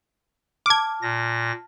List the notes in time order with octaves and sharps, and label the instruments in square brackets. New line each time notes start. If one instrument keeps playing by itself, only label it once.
[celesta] A5 F6 [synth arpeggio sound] D6 G#6
[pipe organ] A#2 A#6